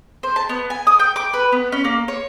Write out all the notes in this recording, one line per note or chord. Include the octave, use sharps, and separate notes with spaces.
C5
A5
B3
G#5
D#6
G5
D6
B4
B3
C#4
A#3
C#5